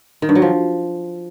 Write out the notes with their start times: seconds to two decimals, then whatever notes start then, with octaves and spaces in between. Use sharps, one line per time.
0.22 D#3
0.29 G2
0.35 F#3
0.42 F3